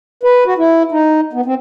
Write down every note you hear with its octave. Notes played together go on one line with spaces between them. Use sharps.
B4
F#4
E4
D#4
B3
C4